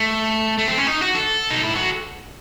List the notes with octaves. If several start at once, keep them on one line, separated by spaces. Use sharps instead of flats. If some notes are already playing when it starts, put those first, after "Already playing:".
Already playing: A3
A3
C4
C#4
D#4
F#4
A4
D#4
E4
F#4